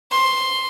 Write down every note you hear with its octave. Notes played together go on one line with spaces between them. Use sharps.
C6